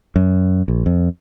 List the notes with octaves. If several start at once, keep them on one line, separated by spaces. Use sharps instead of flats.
F#2
A#1
F2